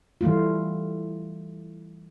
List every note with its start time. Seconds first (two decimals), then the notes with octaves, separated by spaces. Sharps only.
0.21 E3 G3 A3 F4